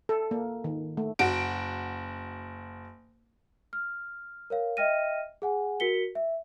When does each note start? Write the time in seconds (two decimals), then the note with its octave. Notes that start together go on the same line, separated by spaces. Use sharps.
0.09 A4
0.31 A#3
0.64 D#3
0.97 A3
1.19 F#1 F#4 D7
3.73 F6
4.50 A#4 C#5 F5
4.77 D#5 E5 G5 F6 A#6 D#7
5.42 G#4 F#5 G#5
5.80 F#4 A#4 B6 C#7 G7
6.15 E5